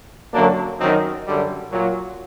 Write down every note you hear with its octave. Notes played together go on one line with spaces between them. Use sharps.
F#2 D3 F#3 A#3 D4
F#2 D#3 F#3 C4 D#4
F#2 D3 G3
A#2 F#3